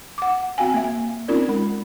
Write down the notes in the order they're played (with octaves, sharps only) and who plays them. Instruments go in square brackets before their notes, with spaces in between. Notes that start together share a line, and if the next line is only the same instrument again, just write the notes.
[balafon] F#5 D6
C4 F#4 F5 G5 G#5
A#3 E5
C4 C#4 D#4 F4 A#4 D5
G#3 A#4 B5